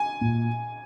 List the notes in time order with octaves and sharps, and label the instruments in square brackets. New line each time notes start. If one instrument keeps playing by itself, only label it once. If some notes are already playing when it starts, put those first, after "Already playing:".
Already playing: [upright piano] G#5
[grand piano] A#2